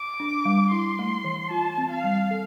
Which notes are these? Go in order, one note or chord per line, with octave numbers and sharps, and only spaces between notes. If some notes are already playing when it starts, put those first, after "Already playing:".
Already playing: D6
D4
G3
E4 C6
A3
E3
F4 A5
C4
F5
G3
A4